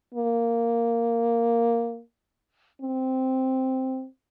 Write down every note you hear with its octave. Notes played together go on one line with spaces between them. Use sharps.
A#3
C4